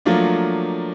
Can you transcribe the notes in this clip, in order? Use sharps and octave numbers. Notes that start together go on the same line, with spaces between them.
F3 F#3 A3 A#3 D4 F4